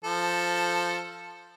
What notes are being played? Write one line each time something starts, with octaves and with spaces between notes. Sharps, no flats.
F3 A4